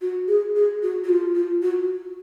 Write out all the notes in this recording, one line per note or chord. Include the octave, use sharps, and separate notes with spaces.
F#4
G#4
G#4
F#4
F#4
F4
F4
F#4